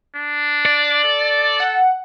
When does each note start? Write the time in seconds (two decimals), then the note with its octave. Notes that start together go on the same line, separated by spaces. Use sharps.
0.16 D4
0.66 D5
1.04 A4
1.60 F#5